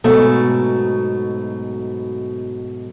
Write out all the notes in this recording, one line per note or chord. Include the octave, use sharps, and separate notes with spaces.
G#2 B2 F#3 A3